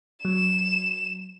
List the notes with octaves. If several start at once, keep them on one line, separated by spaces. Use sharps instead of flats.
F#3 E7